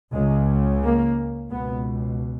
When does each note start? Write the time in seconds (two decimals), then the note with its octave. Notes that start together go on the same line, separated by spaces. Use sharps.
0.13 C#2 C#3 G#3
0.83 A#3
1.50 C#2 B2 B3